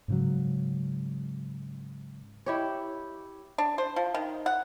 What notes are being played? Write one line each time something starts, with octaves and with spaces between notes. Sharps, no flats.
G#2 C#3 F#3
E4 G4 C#5
D4
C5
F3
D#3
F#5